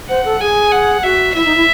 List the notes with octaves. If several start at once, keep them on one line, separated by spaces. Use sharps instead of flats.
C5 F#5
A4
G#4 G#5
F#5
F#4 E5
E4 E5
D#4
E4